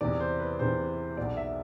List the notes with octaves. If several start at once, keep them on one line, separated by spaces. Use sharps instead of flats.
E2 C3 E3 D5
C5
B4
E2 C3 E3 C5
B1 B2 D5
E5